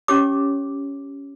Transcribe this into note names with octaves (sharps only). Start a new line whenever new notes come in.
C#4 G4 C#5 D6